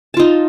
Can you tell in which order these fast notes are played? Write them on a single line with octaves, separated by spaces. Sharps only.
A5 F4 D#4